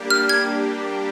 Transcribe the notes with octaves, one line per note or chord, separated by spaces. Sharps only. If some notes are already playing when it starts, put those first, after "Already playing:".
Already playing: G3 A#3 D4 G4
F6
G#6